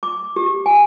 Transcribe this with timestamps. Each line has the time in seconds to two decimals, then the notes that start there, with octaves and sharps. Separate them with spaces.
0.03 D6
0.36 G4
0.66 G#5